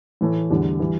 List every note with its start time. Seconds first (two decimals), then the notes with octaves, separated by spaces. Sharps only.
0.21 A2 E3 A3
0.50 E2 D3 G3 D4
0.80 E3 G3